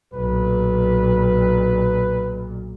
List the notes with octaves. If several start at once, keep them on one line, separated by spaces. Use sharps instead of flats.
B1 A#2 B4